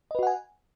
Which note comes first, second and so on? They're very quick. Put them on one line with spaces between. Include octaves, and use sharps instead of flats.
D#5 B4 F#4 F#5 G#5